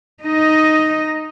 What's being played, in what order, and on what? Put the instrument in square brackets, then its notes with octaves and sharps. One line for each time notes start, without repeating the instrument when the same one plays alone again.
[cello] D#4 D#5